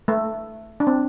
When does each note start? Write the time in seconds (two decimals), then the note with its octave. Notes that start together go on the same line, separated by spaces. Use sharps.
0.08 A3
0.80 D4
0.87 C4